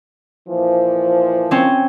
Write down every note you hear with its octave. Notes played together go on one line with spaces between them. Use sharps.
A#2 E3 F3
C4 C#4